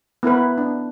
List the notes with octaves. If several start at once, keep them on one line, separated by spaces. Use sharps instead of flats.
B3 E4 A#4 B4
D4